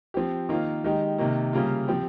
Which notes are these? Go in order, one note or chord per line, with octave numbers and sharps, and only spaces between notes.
F3 C4 G4
D#3 A#3 F4
D#3 G#3 D#4 G4
C3 D#3 A#3
C#3 G3 A#3 F4
F3 C4 G4